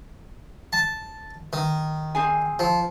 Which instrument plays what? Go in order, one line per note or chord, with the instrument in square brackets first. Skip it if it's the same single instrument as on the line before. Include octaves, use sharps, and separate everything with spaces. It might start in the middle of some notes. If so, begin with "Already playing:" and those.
[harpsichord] A5
D#3
[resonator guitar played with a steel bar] C4 G#4 G#5
[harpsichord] F3